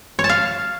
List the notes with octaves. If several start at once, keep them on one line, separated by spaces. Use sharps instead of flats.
C#5
A5
F5